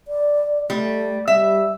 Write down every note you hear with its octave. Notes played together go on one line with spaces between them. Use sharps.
D5
G3 A3
G3 E5